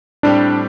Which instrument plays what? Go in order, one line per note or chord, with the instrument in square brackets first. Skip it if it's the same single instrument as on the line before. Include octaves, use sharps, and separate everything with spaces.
[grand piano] A2 G3 C4 G4 [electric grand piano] D4